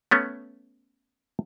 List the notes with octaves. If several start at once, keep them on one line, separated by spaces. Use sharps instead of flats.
A3 B3 C#4